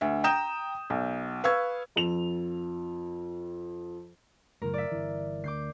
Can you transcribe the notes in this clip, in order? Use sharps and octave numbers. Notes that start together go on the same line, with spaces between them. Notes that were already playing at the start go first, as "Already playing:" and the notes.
D2 E5
G5 A#5 D#6 G6 E7
B1
B4 F5 C#6 E6 G#6
F2 F7
F#1 A2 A#4
D5 E5
G1 E3
D2 D6 G6 C7